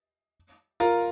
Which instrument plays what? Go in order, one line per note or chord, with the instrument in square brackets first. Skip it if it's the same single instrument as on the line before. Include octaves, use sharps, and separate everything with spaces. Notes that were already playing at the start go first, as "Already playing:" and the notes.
[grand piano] F4 A#4